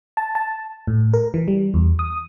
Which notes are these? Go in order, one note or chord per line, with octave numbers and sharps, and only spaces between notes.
A5
A5
A2
A#4
E3
G3
E2
D#6